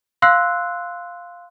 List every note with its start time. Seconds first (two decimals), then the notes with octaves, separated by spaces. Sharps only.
0.22 F5 C6 E6 F#6 C7